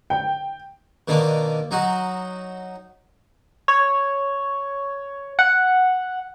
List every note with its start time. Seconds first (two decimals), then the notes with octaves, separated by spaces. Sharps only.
0.10 G5
1.08 B2 D#3 A#3 D4
1.71 F#3 D#4 F#4
3.68 C#5
5.39 F#5